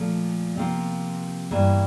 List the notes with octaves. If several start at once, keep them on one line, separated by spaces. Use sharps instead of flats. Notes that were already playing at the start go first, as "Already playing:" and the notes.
Already playing: A#2 F3 A3
C3 F3 A#3 F4
G2 E3 A#3